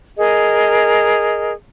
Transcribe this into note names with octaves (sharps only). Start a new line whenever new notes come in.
G#4 A#4 D#5